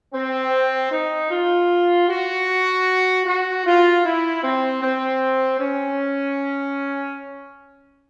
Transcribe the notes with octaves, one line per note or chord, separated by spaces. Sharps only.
C4
D#4
F4
F#4
F#4
F4
E4
C4
C4
C#4